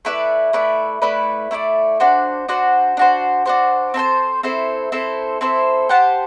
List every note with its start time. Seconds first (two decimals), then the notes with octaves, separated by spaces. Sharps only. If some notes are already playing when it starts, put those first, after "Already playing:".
0.05 A3 E4 B4 D5
0.53 A3 E4 B4 D5
1.02 A3 E4 B4 D5
1.51 A3 E4 B4 D5
2.00 D4 F#4 C5
2.49 D4 F#4 C5
2.97 D4 F#4 C5
3.46 D4 F#4 C5
3.94 C4 E4 A4 C5
4.43 C4 E4 A4 C5
4.92 C4 E4 A4 C5
5.41 C4 E4 A4 C5
5.89 G4 C5 F#5 A5